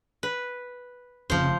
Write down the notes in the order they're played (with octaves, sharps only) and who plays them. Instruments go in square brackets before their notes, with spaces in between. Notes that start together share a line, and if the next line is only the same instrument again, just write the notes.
[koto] B4
[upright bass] F1 C#3 [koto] F3 C5